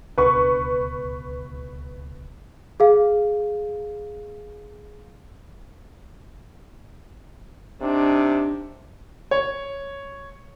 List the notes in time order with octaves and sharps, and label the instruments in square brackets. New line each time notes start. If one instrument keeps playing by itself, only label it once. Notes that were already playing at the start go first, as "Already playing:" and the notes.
[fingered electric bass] D1 C#2 B2 [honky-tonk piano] B4 C#6
[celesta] G#4 F5
[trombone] C3 [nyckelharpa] D4 D#4
[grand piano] C#5